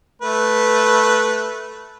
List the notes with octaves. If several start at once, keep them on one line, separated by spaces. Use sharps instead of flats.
A3 B4